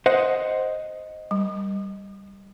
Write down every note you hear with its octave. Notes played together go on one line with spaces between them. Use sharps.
C5 D#5 F#5
G3